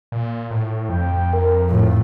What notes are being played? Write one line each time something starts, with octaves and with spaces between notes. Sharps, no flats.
A#2
A2
F2 G5
A#4
A2 F3